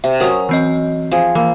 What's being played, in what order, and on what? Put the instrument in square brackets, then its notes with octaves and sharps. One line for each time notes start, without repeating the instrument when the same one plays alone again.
[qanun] C3 [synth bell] E5
[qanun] F#3 C#4 [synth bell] A#4 D#6
[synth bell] E3 C4 D#5
[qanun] F3 G#4
[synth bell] E3 [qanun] A#3